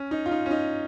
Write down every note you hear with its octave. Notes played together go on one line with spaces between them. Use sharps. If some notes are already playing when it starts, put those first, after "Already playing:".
Already playing: C#4
D#4
F4
D#4
C#4
D#4